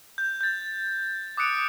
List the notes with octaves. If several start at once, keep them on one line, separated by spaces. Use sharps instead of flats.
G6
G6 A6
D6 D#6 F#6 C#7 D7